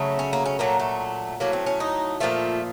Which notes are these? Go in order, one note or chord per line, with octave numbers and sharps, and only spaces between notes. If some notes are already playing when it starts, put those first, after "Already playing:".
Already playing: C#3 F#3 A3
C#4
A#3
C#4
A#2 F#3 A3 A#3
A3
A2 F#3 A3 A#3
C4
C#4
D#4
A#2 F3 A3 F4